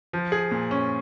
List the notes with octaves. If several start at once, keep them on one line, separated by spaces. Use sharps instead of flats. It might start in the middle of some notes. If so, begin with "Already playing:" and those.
F3
G#4
A#2
C#4